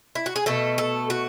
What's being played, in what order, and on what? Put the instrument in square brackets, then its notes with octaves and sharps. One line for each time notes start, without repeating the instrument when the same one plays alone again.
[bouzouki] E4
F#4
G#4
B2 A3 A4
A4
F#4